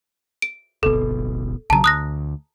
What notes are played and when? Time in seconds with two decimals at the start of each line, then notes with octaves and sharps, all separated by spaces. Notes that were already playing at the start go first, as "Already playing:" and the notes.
0.42 D7
0.83 D1 G1 B2 A4
1.70 A#1 C#3 F#3 A5 A#5
1.84 D2 D#6 F#6 A#6